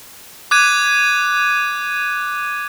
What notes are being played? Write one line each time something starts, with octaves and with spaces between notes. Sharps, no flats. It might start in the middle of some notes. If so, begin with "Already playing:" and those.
D6 F#6 G#6 D#7